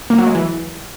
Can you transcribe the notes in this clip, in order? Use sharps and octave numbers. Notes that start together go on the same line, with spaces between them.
A#3
F#3
G#3
E3